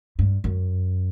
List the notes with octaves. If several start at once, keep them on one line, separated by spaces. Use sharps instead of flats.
G2
F#2